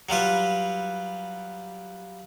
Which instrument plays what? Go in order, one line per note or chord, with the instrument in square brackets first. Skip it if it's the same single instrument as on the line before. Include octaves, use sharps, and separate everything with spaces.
[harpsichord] F#3 G3 F4 B4